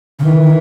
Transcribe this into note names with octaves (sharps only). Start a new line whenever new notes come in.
C#3
D#3 E3
D#3